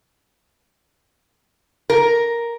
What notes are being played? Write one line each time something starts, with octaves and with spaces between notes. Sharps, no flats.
A#4